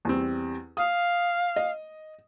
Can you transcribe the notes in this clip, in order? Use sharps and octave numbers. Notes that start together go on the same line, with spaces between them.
E2 G3 C4
F5 D#6
D#5